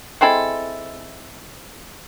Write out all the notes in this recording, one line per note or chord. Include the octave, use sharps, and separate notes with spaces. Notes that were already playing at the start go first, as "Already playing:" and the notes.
G#3 C4 E4 A4